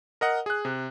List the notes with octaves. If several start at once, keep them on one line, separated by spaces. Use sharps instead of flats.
A#4 D#5 F#5
G#4 F#6
C3